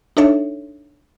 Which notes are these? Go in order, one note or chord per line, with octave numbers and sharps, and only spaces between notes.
D4 D#4 A4 C#5 E5